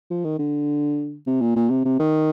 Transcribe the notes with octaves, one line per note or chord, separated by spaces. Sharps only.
F3
D#3
D3
C3
A#2
A#2
C3
C3
D#3